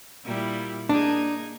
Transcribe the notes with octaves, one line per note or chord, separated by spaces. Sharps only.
A#2 G3 E4
A#3 D4 D#4 G#4